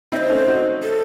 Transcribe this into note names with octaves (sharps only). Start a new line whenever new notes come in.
C4 D#4 C5 E5
A3 C#4
D#4 F#4
A4